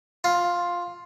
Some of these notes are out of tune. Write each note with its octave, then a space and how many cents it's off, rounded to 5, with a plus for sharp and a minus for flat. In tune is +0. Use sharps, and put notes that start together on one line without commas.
F4 +5